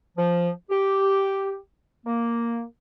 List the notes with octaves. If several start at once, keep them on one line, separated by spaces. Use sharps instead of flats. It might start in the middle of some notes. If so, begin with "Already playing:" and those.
F3
G4
A#3